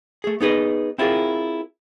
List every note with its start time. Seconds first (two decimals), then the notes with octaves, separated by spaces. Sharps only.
0.24 A3 G#4
0.40 B3 D#4 G#4 B4 D#5
0.98 C4 E4 F4 G4 G#4 A#4